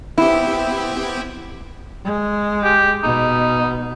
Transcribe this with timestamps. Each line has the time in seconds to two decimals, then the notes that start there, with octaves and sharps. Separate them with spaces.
0.18 B3 C4 E4 G4
2.05 G#3
2.64 G4
3.04 B2 D#4